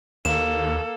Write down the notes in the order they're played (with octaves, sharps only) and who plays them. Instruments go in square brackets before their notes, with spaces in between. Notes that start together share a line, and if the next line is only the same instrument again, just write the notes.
[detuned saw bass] D#2 [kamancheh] A#3 A4 [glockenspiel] E7